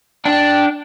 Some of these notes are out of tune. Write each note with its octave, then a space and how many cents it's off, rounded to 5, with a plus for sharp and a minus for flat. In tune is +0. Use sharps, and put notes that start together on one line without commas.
D4 +0 G5 -10